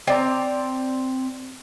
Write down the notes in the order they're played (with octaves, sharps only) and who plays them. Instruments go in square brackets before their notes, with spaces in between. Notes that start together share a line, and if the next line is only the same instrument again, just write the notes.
[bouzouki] C4 D5 A#5